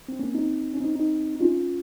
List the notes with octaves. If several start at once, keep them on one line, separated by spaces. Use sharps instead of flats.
C4
A#3 C#4
C4 D#4
C#4
C4 D#4
C4 D#4
D#4
C#4 F4